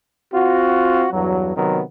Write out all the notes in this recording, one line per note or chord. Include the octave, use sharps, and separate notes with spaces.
C4 F4 F#4
E2 G2 F#3
C3 D#3 F#3 B3